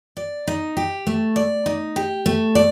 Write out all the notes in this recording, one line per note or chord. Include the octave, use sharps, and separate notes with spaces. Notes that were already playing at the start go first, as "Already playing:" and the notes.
D5
D#4
G4
A3
D5
D#4
G4
A3
D5